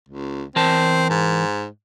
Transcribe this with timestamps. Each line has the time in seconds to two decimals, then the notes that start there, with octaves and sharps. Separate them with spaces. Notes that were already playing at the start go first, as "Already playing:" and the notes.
0.09 C#2
0.56 E3 C4 A#4 A5
1.10 G#2